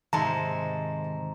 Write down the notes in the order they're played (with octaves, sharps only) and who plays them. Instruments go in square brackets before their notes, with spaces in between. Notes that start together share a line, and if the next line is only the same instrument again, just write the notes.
[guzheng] G#2 C3 G#3 [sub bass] D#3 [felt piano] A5 [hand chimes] A#5